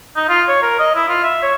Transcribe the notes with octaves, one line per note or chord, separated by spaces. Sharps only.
D#4
F4
C#5
A#4
D#5
E4
F4
E5
C#5